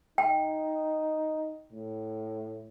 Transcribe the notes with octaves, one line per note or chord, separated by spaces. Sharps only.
D#4 G5
A2